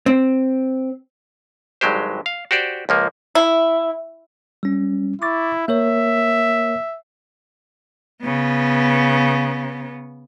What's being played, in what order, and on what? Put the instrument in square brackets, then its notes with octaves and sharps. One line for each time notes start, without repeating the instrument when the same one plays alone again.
[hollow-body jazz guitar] C4
[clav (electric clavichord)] G#1 G2 F#3 G#3 G4 C5
F5
F#4 G4 C5 D5
C#2 F3 A#3
[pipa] E4
[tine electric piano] G3 C#4
[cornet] E4 [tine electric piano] C#6 D6 A6
[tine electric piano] A#3 A#4 C#5 [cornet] E5
[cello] C#3 B3